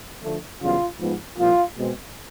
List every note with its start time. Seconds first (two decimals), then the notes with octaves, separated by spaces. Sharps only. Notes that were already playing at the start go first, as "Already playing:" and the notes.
0.23 D2 D3 F3 A3
0.61 F#2 C#3 E3 G3 B3 F4
1.00 G#2 F3 G#3 B3
1.38 C2 A#2 F3 F4
1.77 B2 G#3 C4